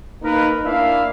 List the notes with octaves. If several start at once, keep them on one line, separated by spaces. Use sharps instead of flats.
A#3 D#4 A#4 B4
A#3 D4 E4 D5 E5 F5